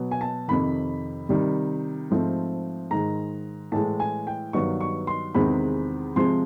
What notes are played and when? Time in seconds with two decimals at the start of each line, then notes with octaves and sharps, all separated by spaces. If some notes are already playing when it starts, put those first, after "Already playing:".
Already playing: B2 F#3 B3
0.11 G#5
0.21 A5
0.48 F2 C3 D#3 B5
1.29 C3 D#3 G3
2.10 G#2 F3 A3 C4
2.91 G#2 D#3 G#3 A#5
3.72 A2 E3 G#3 A5
4.00 G#5
4.27 G5
4.53 G2 D#3 F#3 B3 C#6
4.81 C#6
5.07 C6
5.35 E2 C3 D#3 G#3 C4 B5
6.16 C3 F3 G#3 C4 C6